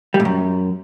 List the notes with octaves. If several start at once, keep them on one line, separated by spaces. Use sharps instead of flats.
G3
A2
F#2